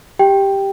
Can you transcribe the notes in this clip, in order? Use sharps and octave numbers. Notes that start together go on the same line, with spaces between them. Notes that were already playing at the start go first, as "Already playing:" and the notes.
G4 G5